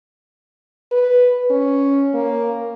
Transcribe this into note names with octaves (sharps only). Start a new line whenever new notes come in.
B4
C#4
A#3